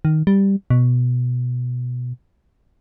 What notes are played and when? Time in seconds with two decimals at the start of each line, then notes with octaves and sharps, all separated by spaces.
0.05 D#3
0.27 G3
0.70 B2